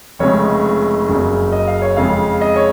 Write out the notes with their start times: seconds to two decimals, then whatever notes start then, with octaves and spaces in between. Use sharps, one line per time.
0.19 F1 F2 C#3 G#3 C#5
1.09 F#1 F#2 C#3
1.52 D#5
1.67 F5
1.82 C#5
1.96 F2 C#3 G#3 F5
2.41 D#5
2.56 C#5